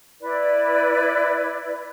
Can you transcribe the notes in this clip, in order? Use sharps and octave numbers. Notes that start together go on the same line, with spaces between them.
E4 B4 D5